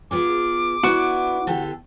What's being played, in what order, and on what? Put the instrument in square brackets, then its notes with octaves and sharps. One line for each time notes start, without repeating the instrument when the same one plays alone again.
[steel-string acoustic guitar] B3 F4 G#4 [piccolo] D6
[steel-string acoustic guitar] B3 D4 E4 [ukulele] F#4
[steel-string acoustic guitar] D3 G4 A4